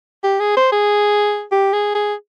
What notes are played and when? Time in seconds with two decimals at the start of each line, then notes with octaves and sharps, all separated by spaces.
0.24 G4
0.40 G#4
0.57 C5
0.72 G#4
1.52 G4
1.73 G#4
1.95 G#4